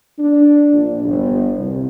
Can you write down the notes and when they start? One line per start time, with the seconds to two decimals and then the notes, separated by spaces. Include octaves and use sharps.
0.19 D4
0.73 A#1
1.04 G1
1.56 C2